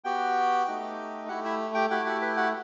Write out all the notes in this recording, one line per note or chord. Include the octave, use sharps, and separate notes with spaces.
B3 F#4 G4 G5
A3 D#4 G4
A3 E4 F#4 G4 F#5
E4 E5
G4 G5
A3 E4 F#4 G4 F#5
F#4 F#5
B4
F#4 F#5